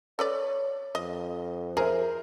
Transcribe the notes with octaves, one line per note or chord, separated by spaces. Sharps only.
A4 B4 C#5 D5
F2 D#5
G#4 A#4 C5 E5